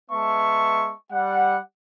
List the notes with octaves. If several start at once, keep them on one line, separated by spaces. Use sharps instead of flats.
G#3 B3 E5 A5 C#6
G3 F#5